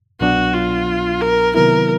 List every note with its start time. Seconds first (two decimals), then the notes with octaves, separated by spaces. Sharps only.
0.21 C2 B2 F#3 B3 D4 F#4
0.54 F4
1.21 A#4
1.55 C3 D#3 F#3 B3 E4 A#4